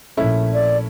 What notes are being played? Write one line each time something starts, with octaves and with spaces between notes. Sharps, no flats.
A#1 A3 C#4 E4
D5